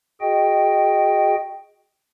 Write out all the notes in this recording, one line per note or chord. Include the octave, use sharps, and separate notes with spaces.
F#4 G#4 D#5 G5